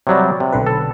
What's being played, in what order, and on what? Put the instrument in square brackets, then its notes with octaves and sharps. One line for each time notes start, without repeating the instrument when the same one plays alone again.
[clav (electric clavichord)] C3 F#3 G3 [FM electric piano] C#5 D5
[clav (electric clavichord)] C3
[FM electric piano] B1 D3 B4
[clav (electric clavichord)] A4